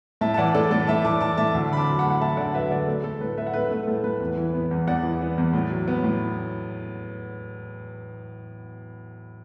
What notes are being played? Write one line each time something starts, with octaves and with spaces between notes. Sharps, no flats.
A2 E5 A5
A5
E3 D5 F#5
A3 A4 D5
A2 A4 D5
A2 E5 A5
E3 A5 D6
A3 A5 D6
A2 E5 A5
D2
D3 B5
A5 D6
F#3
F#5 B5
D2
F#5
D2 E5 A5
D3 D5 F#5
F#3 B4 E5
D2 A4 D5
A3
A3 A4
A2 B4
A2 B4 E5
F#5
A3 B4 E5
A3 B4
A2 A4
A2 B4
E2
E3
B3
E2
E2 D5 F#5
E3
B3
E2
A2
F#3
B3
A2